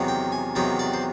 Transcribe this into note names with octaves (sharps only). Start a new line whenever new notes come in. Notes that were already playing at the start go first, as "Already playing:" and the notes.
Already playing: E2 C3 D#3 F#3 B3
G5
G#5
E2 C3 D#3 F#3 B3 G5
D5
C5